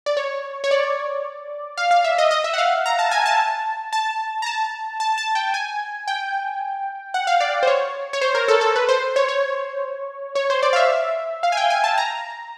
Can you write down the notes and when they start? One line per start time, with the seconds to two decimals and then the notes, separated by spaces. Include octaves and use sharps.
0.06 D5
0.17 C#5
0.64 C#5
0.71 D5
1.77 F5
1.91 F5
2.04 E5
2.18 D#5
2.31 D#5
2.44 E5
2.53 F#5
2.58 F5
2.86 A#5
2.99 A5
3.11 G#5
3.26 A5
3.93 A5
4.42 A#5
4.46 A5
5.00 A5
5.18 A5
5.35 G5
5.54 G#5
6.07 G5
7.14 F#5
7.27 F5
7.40 D5
7.63 C5
7.67 C#5
8.13 C#5
8.21 C5
8.35 A#4
8.48 A4
8.61 A4
8.76 B4
8.89 C5
9.16 C#5
9.28 C#5
10.35 C#5
10.50 C5
10.63 D5
10.73 F5
10.76 E5
11.43 F5
11.52 G#5
11.57 G5
11.70 G#5
11.84 A5
11.98 A#5